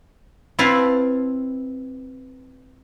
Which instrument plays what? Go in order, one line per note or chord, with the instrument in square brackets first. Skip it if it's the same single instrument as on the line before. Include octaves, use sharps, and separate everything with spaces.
[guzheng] C4 E4 B4 F5 A5